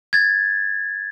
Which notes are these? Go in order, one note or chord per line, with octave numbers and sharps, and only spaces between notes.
G#6 A6